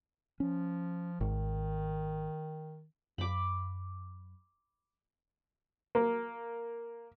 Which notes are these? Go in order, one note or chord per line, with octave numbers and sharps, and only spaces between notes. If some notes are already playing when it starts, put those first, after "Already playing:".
F3 C#4
G#1 D#3
F#2 B5 D6
A#3